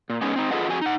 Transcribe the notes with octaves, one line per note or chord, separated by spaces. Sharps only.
A#2
G#3 B3 C#4 D#4
C4 D#4
F4 G#4 A4 B4 D#5 F#5
F2 F#4 G#4 G#5
D#4 F#5